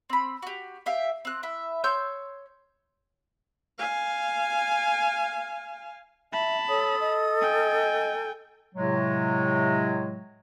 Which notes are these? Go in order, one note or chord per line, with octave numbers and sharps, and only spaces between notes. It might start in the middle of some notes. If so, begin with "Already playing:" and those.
C4 B5
F#4 G4
G4 E5 F5 G5
C4 F#6
E4 E5
C#5 C6 E6 G6
F5 G#5
E5 A5 B5
A4 C#5 D#6
D#5
G5 G#5
A2 C3 F#3 G#3